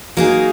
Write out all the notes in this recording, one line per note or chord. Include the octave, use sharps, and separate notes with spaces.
F#3 A#3 D#4 G#4